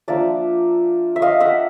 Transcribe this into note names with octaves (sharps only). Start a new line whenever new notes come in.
F3 A#3 D4 D5 E5
E5
D#5 F5
E5 F#5